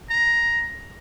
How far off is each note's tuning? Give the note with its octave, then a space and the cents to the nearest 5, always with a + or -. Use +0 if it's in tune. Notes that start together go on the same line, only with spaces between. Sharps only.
A#5 +10